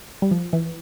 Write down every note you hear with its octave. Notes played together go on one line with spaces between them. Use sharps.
G3
F3
E3